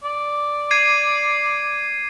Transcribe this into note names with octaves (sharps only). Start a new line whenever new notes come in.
D5
G#6 C7 D#7